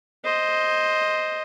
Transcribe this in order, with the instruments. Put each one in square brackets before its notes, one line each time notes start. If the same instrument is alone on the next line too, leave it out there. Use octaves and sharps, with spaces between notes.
[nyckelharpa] C5 D#5